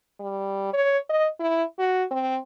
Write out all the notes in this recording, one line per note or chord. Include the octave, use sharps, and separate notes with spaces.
G3
C#5
D#5
E4
F#4
C4